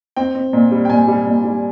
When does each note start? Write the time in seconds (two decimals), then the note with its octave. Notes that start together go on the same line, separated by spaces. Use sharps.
0.16 C4 G5
0.35 C4
0.53 A#2
0.71 G3
0.85 G5
0.90 A#2 G#5
1.08 G3
1.26 A#2
1.44 G3